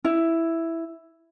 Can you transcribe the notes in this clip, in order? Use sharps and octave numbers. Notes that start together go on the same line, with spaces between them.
E4